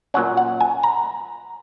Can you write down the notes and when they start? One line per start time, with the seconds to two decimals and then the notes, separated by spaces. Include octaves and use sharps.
0.14 A#2 F#3 C#4 F#5
0.37 F#5
0.61 G#5
0.83 A#5